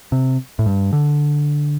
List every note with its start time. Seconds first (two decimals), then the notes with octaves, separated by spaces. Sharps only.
0.12 C3
0.59 A2
0.66 G2
0.93 D3